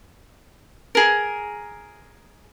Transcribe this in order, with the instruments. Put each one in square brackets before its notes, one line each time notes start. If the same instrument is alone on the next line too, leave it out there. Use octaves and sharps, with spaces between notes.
[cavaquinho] G#4 A#4